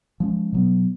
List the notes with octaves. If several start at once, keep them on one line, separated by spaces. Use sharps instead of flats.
F3 G#3 C#4
B2 F#3 B3